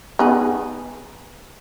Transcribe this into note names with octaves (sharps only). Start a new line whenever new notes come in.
B3 D#4 G#4